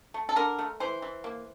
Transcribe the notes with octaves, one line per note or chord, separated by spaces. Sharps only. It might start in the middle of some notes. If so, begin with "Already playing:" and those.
A3
A4
D3 A#4
A3
E3 C5
E3
A#3